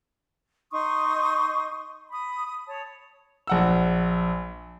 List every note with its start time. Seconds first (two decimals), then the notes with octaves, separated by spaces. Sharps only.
0.72 D#4 C6 C#6 D#6
2.11 B5 D#6
2.68 C#5 A5
3.47 A#1 F#5 E6